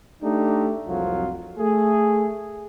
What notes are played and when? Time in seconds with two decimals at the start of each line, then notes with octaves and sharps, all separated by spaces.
0.23 A3 D4 D#4 G4
0.88 C2 F2 F#3 F4
1.59 A3 G#4